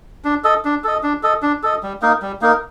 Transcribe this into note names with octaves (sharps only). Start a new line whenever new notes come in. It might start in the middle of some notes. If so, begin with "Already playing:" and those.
D4
A4 D#5
D4
A4 D#5
D4
A4 D#5
D4
A4 D#5
G3
A#3 D#4 A#4
G3
A#3 D#4 A#4